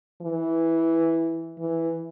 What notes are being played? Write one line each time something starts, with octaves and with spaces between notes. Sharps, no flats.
E3
E3